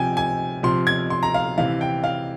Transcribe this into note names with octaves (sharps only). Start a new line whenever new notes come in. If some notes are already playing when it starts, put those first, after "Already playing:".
Already playing: C3 F3 G5 G#5
G#5
C3 F3 C6
G#6
C6
A#5
F5
C3 E3 F5
G5
F5